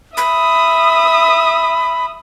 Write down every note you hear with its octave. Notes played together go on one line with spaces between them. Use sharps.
E5 B5 D#6